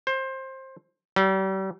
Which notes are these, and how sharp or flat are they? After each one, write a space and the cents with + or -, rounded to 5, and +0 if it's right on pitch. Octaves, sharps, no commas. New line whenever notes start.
C5 +20
G3 -40